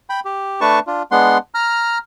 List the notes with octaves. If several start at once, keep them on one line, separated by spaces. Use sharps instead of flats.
G5 B5
G4
A3 D4 B4 A5 C#6
D4 F4
G#3 B3 D4 F#5 C6
A#5 F6